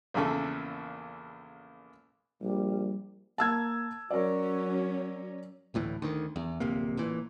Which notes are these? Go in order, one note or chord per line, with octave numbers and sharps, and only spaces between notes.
A#1 E2 C#3 A4
A#1 G3
A#3 A5 E6 G#6
F#3 C#4 F#4 A#4 D5
A1 D2 A2 E3
D2 D#3
E2
D1 A#1 C3 A#3
A1 A#2 E3